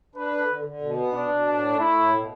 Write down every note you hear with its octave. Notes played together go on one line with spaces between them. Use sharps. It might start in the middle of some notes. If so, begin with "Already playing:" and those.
D4 B4
D3
D3
D3
B2
B3
B2 D4
B2
A2
A3
A3 E4
A2
B2